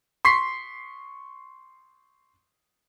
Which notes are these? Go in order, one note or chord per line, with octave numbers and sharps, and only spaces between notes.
C6 C#6 B6 C7